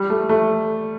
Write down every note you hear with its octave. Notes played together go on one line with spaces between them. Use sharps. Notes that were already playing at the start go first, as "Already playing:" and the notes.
Already playing: G3
A3
A3